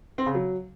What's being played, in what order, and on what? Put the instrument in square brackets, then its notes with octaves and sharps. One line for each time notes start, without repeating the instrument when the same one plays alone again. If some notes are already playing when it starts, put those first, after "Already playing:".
[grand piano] C4
C#3
F#3